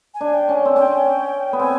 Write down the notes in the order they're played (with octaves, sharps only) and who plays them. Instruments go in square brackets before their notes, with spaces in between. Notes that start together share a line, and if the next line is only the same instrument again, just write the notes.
[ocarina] G#5
[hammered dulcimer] D4
[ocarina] G5
[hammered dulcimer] C#4
C4
[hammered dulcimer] C#4 [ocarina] G5
[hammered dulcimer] B3
[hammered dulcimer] C4 [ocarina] G#5